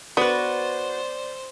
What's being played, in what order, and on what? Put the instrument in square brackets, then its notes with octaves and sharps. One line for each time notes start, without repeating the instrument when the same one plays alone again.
[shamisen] B3 [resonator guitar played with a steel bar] F#4 B4 [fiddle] C5 [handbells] D5